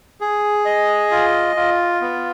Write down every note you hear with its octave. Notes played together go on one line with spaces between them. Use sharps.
G#4
D#5
F4
F4
B3